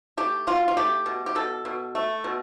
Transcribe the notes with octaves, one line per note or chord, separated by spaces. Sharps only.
A3 G4
B2 F4
F4
A3 G4
B2
G4
B2 A4
B2
A3
B2